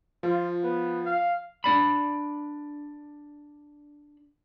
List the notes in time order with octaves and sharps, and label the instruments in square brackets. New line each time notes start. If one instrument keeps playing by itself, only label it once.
[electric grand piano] F3 [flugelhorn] F4
[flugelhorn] B3
F5
[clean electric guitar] D4 D5 B5